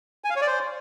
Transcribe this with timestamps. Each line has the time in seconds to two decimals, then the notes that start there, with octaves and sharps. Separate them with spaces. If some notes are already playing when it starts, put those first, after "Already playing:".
0.24 G#5
0.30 F5
0.36 C#5
0.41 D5
0.47 C5